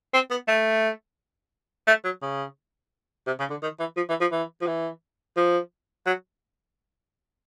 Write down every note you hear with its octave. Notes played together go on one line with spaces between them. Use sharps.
C4
B3
A3
A3
F#3
C#3
C3
C#3
D3
D#3
E3
F3
E3
F3
E3
F3
E3
F3
F#3